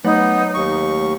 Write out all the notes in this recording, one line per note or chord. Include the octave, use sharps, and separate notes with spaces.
F#3 A3 B3 D#4 C#5
D#2 C#6